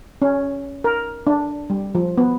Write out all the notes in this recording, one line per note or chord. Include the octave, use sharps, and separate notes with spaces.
C#4
A#4
D4
G3
F3
B3